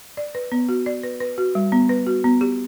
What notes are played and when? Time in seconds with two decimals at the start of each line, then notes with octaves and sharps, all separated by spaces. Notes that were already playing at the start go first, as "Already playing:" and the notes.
0.17 D5
0.35 B4
0.52 B3
0.69 F#4
0.86 D5
1.03 B4
1.20 B4
1.38 F#4
1.55 G3
1.72 B3
1.89 B4
2.07 F#4
2.24 B3
2.41 G4